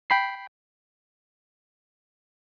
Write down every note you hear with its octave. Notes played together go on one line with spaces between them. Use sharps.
G5 B5 C7